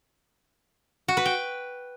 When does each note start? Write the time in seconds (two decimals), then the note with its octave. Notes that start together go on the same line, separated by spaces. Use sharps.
1.08 F#4
1.17 B4
1.26 G5